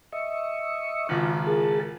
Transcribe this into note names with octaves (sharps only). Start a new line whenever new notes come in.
D#5 E5 C#6
G#1 C#2 F4
G#4 A#4 A5